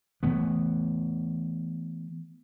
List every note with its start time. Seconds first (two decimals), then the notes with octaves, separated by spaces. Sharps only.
0.23 E3 A3 B3